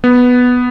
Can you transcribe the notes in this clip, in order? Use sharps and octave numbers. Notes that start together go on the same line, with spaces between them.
B3